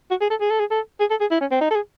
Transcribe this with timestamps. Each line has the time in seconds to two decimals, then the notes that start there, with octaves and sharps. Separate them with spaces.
0.10 F#4
0.21 G#4
0.30 A4
0.40 G#4
0.50 A4
0.60 G#4
0.71 A4
1.00 G#4
1.10 A4
1.20 G#4
1.31 E4
1.41 C#4
1.51 C4
1.61 D#4
1.70 A4
1.76 G#4